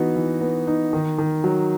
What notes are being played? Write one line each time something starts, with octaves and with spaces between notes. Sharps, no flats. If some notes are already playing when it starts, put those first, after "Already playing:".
Already playing: E3 B3 D#4 F#4
E3
B3
D#4
D#3
D#3
F#3